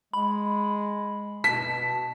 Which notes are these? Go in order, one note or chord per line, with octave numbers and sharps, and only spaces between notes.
G#3 B5
B2 A5 B6